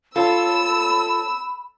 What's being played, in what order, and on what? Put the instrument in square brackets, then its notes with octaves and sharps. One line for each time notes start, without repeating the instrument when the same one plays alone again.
[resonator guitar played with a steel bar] F4 [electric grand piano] A4 C#5 A5 [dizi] B5 [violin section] E6